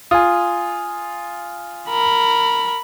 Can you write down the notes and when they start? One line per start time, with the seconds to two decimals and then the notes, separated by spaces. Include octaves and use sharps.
0.11 F4 G#5 D#6
1.90 A#4 B5